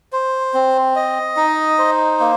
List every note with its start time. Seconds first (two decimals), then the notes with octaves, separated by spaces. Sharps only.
0.12 C5
0.54 C4
0.96 D#5
1.36 D#4
1.79 C5
2.20 A#3